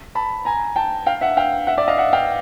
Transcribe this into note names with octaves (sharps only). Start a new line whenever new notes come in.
A5 B5
G#5 A#5
G5 A5
F5 G5
E5 F#5
F5 G5
E5 F#5
D5 E5
D#5 F5
E5 F#5
F5 G5